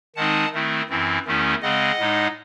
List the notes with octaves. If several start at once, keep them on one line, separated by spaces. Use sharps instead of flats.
D#3 G#3 C4 D#4 F#5 A5
D#3 A3 C4 E4
F#2 E3 C4 E4
E2 D#3 A3 C#4 E4
C#3 G#3 C4 D#5 F#5
A2 G#3 D#4